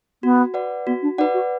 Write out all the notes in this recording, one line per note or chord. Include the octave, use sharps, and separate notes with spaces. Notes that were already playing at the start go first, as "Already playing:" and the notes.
B3 F#4
B4 D5 F#5
B3 F#4
D4
D#4 B4 D5 F#5
F#4